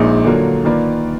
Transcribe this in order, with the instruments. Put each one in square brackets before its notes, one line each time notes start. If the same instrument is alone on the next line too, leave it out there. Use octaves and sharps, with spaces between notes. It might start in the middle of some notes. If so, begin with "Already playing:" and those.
Already playing: [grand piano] A#1 A#2 G#3 D#4
D3 F#3 A#3 F4
D#3 A#3 F4 B4 D5